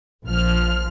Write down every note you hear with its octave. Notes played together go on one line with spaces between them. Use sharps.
A#1 F3 F6